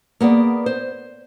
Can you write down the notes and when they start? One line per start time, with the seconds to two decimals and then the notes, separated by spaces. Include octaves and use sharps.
0.21 A#3 B3 G#4 D5
0.66 C5